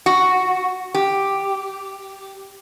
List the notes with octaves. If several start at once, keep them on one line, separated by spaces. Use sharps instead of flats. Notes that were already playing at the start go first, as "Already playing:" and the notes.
F#4
G4